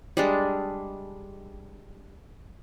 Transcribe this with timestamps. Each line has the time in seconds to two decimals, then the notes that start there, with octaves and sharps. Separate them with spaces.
0.17 G3 G#3 D4